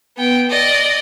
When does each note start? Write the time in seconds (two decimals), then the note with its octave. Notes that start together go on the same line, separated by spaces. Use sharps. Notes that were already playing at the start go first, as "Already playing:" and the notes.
0.17 B3 G5
0.50 D5 D#5